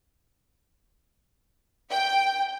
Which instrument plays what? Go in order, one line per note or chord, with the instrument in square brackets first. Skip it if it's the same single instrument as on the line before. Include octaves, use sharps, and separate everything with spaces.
[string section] G5